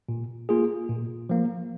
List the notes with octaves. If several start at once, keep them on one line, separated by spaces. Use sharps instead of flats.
A#2
A#3 F4 G#4
A#2
F3 A#3